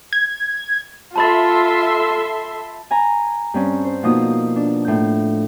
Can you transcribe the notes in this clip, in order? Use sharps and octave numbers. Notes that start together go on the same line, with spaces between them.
G#6
F4 A4 E5 A5 B5 C6 A6
G#5 A#5 B5
G2 C4 C#4
C5
B2 F3 A#3 D#4 D#6
D4
A2 G6